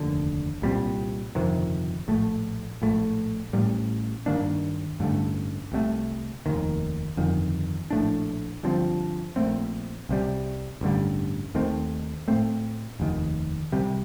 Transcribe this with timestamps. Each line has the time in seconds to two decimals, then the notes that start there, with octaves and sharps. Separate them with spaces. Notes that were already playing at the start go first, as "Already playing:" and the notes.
Already playing: F1 D#2 D3
0.62 C2 A#2 G3 C4
1.35 G1 F2 C3 D#3
2.08 A#1 A2 A3
2.82 A#1 A2 A3
3.53 A1 A2 G3
4.26 G2 D#3 A#3 D4
5.00 A1 G2 D3 A3
5.72 C2 C3 D#3 A3
6.46 F1 D#2 D#3
7.17 G1 F2 D#3
7.91 A#1 A2 A3 D4
8.63 G1 G2 F3 C4
9.36 A#1 A#2 A3 C4
10.09 C2 C3 G3
10.81 A1 G2 D3 G3
11.55 D#2 D#3 A3 C4
12.28 A2 A3 C4
13.00 F1 D#2 D#3
13.72 C2 C3 G3